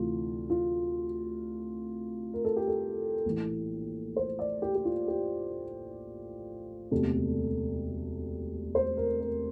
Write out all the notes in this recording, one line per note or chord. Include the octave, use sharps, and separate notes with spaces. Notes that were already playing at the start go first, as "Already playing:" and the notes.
Already playing: D2 C3 E3 F4
F4
A#4
A4
G4
A4
A#1 A2 E3
C5
D5
G4
G4
F4
G4
E1 D2 C3 A4
C5
A#4
A#4